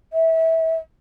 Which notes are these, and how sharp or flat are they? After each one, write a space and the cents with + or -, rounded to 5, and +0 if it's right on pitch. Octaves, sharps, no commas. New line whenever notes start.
E5 -25